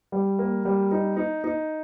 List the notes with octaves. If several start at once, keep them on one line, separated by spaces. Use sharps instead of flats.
G3
A#3
G3
D#4
D#4
D#4